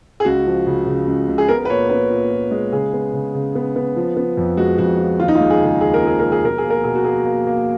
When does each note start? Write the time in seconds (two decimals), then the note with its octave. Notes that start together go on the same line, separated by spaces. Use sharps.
0.20 G#4
0.25 C#2 F#4
0.46 F3
0.66 C#3
0.86 C#3
1.07 C#2
1.29 C#2
1.38 G#4
1.48 B3 A#4
1.65 B4
1.69 A#2 C#5
1.89 B3 B4
2.10 A#2
2.32 A#2
2.51 G#3
2.72 C#3 G#4
2.93 B3
3.13 C#3
3.34 C#3
3.55 B3
3.76 B3
3.96 F3
4.16 B3
4.37 F2
4.57 G#3 F#4
4.78 F2 F#4
4.99 F3
5.20 D#2 F4
5.28 D#4
5.35 F4
5.40 G#3
5.50 G#4
5.61 C#3 G#4
5.81 D#2 G#4
5.94 A#4
6.03 F3 G#4
6.19 F3 A#4
6.32 G#4
6.44 B2 A#4
6.58 G#4
6.64 A#3
6.70 A#4
6.84 B2 G#4
6.95 F#4
7.04 A#3 G#4
7.25 A#3
7.47 A#3